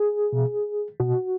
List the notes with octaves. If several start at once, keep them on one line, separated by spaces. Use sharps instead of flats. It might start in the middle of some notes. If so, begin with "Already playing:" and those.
Already playing: G#4
B2
B2 F#4